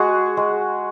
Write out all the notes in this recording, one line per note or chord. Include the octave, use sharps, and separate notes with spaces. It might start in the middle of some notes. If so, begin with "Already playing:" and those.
Already playing: G#3 F#4 G#4
G#3